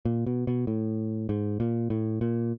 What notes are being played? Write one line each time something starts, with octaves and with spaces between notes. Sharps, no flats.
A#2
B2
B2
A2
G#2
A#2
A2
A#2